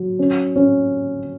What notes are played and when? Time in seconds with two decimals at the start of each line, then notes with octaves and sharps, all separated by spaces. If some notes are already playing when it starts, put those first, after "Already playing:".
Already playing: F#3
0.19 C#4
0.56 C#4